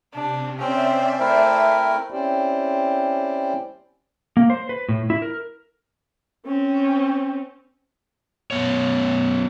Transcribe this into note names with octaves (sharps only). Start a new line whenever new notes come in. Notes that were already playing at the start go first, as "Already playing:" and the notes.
C3 D4
C4 C#4 C5 D5 E5
A3 C4 E4 A#4
C4 C#4 E4 G4 C5 D5
A#3
C5
B4
A2
E4
A#4
C4 C#4
F#2 B3 C#5